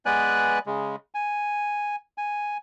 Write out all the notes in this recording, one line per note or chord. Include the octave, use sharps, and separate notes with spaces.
G#3 B3 B4 D5 G#5 F#6
C#3 G#3
G#5
G#5